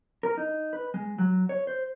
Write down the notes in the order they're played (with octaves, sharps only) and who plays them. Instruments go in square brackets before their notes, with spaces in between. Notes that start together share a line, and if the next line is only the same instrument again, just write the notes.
[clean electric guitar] A#4
D#4
B4
G#3
F#3
C#5
C5